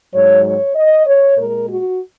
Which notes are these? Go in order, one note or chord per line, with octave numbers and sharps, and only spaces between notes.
G#2 F#3 C#5
C#5
D#5
C#5
A#2 G#3 A#4
F#4